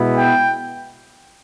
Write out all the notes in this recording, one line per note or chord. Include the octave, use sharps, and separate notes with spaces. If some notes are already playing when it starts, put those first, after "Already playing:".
Already playing: B2 G#3 B3 E4
G5